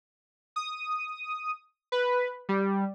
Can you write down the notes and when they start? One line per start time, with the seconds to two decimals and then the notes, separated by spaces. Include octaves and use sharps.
0.56 D#6
1.92 B4
2.49 G3